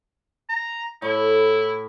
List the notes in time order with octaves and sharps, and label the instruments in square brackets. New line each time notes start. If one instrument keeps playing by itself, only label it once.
[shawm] A#5
[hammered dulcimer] A2 [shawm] E4